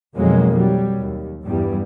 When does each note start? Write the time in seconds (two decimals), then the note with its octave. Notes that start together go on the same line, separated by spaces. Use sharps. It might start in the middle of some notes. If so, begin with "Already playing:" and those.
0.17 B1 F2 D#3 F#3 G#3 A#3
0.57 F#3 G3
0.98 D#2
1.44 E2 G2 G3